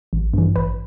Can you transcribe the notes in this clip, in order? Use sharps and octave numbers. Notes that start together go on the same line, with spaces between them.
A1
G2 E3
A1 B4